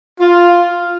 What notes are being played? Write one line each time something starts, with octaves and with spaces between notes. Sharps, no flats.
F4